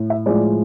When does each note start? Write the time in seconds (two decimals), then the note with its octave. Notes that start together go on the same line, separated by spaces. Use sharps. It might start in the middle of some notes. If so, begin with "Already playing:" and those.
Already playing: A2
0.10 E5
0.26 A2 F3 G#3 D5